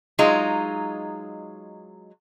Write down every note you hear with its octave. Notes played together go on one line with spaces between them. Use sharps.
F#3 G#3 D#4 F4